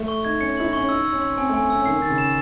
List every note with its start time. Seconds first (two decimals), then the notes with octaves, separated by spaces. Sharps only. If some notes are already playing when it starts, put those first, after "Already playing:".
Already playing: A3
0.08 C#6
0.25 D#4 G#6
0.40 C#4 C#7
0.57 E4 F#7
0.64 D#4
0.73 C#4 C#6
0.89 D#4 E6
1.05 E6
1.13 C#4
1.21 C6
1.37 C4 G#5
1.49 A3 G#5
1.61 C4
1.70 C#4 E6
1.86 D#3 C7
1.98 D#3 A6
2.09 C#3
2.18 E7